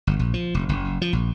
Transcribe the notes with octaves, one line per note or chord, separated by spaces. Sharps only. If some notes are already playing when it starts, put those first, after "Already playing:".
G1
A#1
F3
F1
F#1
F3
A#1